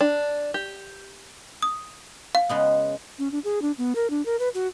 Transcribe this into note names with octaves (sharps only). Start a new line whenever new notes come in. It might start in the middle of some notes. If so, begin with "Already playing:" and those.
D4
G4
D#6
F5
C#3 G#3 B3
C#4
D4
G#4
D4
B3
A#4
D4
A#4
B4
F#4